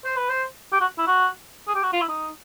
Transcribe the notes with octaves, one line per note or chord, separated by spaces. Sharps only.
C5
B4
C5
G4
F#4
E4
F#4
G#4
G4
F#4
F4
E4
D#4